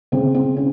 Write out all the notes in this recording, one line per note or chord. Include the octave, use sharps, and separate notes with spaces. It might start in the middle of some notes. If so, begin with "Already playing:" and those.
C#3 C4
C4
C#4